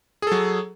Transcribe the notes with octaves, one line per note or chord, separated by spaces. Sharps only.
F#3 G#4 A4